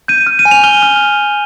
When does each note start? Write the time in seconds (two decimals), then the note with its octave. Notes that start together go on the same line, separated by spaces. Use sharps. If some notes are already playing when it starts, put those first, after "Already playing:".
0.08 G6 D#7
0.27 F6
0.39 D#7
0.45 G#5
0.51 F7
0.64 F6 G7
0.83 F6